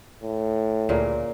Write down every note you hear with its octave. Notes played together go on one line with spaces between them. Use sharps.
A2
D2 A#2 C#3 A#3